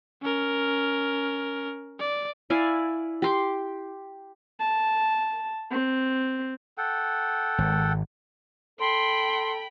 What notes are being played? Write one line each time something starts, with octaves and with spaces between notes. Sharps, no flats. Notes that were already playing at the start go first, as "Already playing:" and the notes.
C#4 A#4
D5
E4 D5 F5 G#5
G4 C6 D6
A5
C4
A4 F#5 G5
G#1
A4 G5 B5 C6